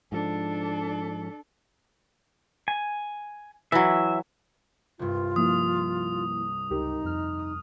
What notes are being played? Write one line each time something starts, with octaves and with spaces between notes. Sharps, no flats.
G#2 F3 D4 A4
G#5
E3 F#3 E5
C2 G2 F4
F3 A#3 E4 D#6
C#2 D#4 G4 A#4
F2 F6
D#6